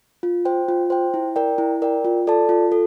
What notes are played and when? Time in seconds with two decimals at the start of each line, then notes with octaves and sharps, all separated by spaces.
0.23 F4
0.45 C5 G5
0.69 F4
0.90 C5 G5
1.14 E4
1.36 A#4 D5 G5
1.58 E4
1.82 A#4 D5 G5
2.05 F4
2.27 A4 D5 A5
2.49 F4
2.72 A4